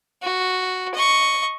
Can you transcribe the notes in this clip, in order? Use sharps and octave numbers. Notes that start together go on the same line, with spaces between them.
F#4
D#5 C#6